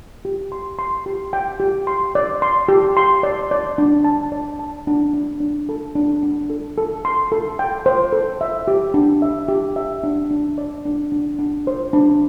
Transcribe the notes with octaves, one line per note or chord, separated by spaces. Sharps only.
G4
C6
C6
G4
G5
G4
C6
D5
C6
G4
C6
D5
D5
D4
A5
D5
A5
D4
D4
D4
A4
D4
D4
A4
A4
C6
A4
G5
C5
A4
E5
G4
D4
E5
G4
E5
D4
D4
D5
D4
D4
D4
C5
D4